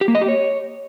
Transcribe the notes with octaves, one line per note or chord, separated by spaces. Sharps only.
G4
A#3
D#5
G4
C#5